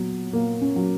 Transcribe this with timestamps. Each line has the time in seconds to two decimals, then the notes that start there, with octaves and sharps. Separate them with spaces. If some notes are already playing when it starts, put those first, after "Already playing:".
Already playing: A#2 F#3 B3
0.33 A#2 A#3
0.61 C#4
0.76 F#3